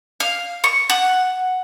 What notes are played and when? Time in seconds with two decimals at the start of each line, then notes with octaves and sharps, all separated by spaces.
0.20 F5
0.64 C#6
0.90 F#5